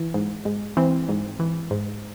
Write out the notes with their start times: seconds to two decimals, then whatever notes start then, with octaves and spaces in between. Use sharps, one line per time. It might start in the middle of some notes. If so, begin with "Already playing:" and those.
Already playing: E3
0.14 G#2
0.45 G#2
0.77 E3 C4
1.09 G#2
1.40 E3
1.71 G#2